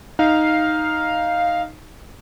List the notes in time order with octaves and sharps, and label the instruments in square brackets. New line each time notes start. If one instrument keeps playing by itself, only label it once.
[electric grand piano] D#4 [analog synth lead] F5